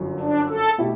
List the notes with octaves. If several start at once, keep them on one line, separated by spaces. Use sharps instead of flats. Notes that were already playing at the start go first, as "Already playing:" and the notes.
Already playing: G1 F#2 D3 F#3
D4
A4
B2 A3 E4 G4